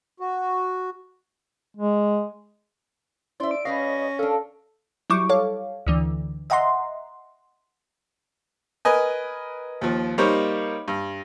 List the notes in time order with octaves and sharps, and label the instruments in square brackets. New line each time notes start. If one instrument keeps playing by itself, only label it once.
[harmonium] F#4
[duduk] G#3
[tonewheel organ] C#4 E4 C5 [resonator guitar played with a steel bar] D5 E5 [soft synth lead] C6
[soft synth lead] D7
[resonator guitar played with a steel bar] G3 B4 F5 [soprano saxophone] C#4 [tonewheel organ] C#5 D#5 [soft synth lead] A#6
[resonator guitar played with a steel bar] D4 A#4 [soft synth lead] A4 [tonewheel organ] F5
[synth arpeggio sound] F#3 G3 E4 C#6 D6
A4 C#5 F5
D2 D3 E3
D#5 E5 F#5 A#5 C6
[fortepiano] A#4 B4 D#5 G#5
D#2 F3
G3 A#3 D#4 C5 C#5
G2